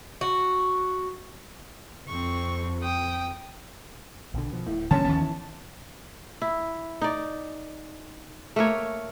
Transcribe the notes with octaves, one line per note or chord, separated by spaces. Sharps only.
F#4
F2 C4 C#6
G5 D#6
A#1 B2 D3
B2 F3
D1 A2
G2 A#2 D3 E3 A#3 C#4 A5
G#1 D#2 D#3 F3 B3
E3
E4
D#4 D5
A3 A#3 A#4 C#5